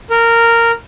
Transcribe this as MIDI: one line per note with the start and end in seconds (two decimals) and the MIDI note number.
0.10 0.72 70